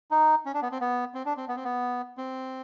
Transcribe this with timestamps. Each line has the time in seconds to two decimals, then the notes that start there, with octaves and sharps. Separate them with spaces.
0.11 D#4
0.46 C#4
0.54 D4
0.62 B3
0.72 C4
0.81 B3
1.14 C4
1.25 D4
1.37 C4
1.48 B3
1.56 C4
1.64 B3
2.18 C4